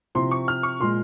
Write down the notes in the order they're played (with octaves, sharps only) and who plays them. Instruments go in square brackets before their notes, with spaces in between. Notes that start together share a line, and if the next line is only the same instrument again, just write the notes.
[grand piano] C3 F3 C4 E4 [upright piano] C6
[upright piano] C#6
F6
C#6
[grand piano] A#2 F3 G#3 [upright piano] C6